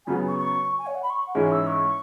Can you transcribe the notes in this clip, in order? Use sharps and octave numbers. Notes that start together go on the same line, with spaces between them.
F#2 C#3 F#3 B3 G#5
C#6
C#6
G#5
C#5
F#5
B5
C#6
F#5
G#2 E3 G#3 C#4 E4 G#5
E6
C#6